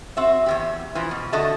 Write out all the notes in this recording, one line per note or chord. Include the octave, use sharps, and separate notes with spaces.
C4 F#4 E5
E2 C3 G4
E3 F3
B2
D3 F#4 A4 D#5 E5 A5